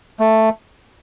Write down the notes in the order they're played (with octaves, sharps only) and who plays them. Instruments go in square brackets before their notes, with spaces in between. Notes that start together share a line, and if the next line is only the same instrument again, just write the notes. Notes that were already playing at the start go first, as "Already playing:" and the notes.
[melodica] A3